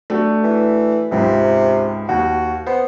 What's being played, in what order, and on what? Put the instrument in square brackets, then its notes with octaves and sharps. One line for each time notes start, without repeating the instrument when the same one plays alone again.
[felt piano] A3 D4 F#4
[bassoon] E3
[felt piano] C#2 G#2 [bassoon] C3
[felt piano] D#2 [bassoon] F#4
[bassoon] B3 [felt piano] C5